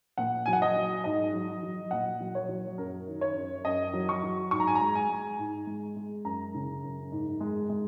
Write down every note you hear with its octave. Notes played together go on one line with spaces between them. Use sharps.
A#2 F#5
F#3 G#5
F#5
D#5
F#3
G#2 D#5
F#3
F#3
A#2 F#5
F#3
C#5
F#3
F#2 A#4
D#3
C#5
F#2
F#2 D#5
F#3
C#6
F#3
G#2 C#6
A#5
G#5
A#5
G#3
G#5
G#3
G#2
G#3
G#3
F#2 A#5
C#3
F#2
G#2
G#3
G#3